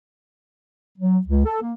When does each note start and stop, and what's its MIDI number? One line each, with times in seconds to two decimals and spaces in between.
0.98 1.18 54
1.27 1.45 37
1.45 1.59 69
1.62 1.72 58